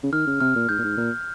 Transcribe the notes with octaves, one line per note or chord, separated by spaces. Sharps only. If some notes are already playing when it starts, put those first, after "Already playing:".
C#3
D#3 F6
C#3
C3 F6
A#2
G#2 G6
A#2
G#2
A#2